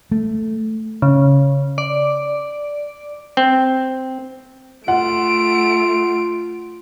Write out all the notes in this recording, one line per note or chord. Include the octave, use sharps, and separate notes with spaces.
A3
C#3
D5
C4
A3 F4 F#5 D7